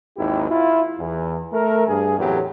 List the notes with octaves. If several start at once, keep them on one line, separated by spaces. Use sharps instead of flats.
G#1 D#2 D#3 E4 G4
E4 F4
E2
A3 A#4
G2 G#4
E2 A2 F#3 C4 G4